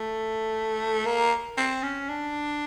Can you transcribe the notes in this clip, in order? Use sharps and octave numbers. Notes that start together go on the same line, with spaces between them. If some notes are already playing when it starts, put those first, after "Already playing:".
Already playing: A3
A#3
C4
C#4
D4